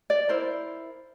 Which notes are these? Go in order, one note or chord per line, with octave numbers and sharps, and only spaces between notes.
D5
E4 A#4 C5